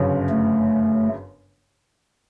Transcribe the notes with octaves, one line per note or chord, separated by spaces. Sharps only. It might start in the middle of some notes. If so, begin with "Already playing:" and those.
Already playing: G1 F#2 C#3
A3